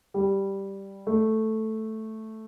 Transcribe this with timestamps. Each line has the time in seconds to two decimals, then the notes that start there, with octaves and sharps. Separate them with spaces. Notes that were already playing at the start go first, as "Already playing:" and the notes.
0.14 G3
1.07 A3